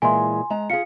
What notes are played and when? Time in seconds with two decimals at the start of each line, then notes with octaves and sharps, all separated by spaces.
0.02 A#2 E3 G#3 G#5 C6
0.50 G#3 A#5
0.70 F4 G#4 F5 C#7